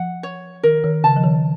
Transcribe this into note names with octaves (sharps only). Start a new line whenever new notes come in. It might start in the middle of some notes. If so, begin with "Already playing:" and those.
Already playing: F3 F#5
C#5
D#3 A#4
D#3
C#3 A5
F3
D#3